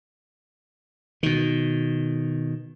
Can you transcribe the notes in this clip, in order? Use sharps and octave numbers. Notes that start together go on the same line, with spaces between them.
B2 D#3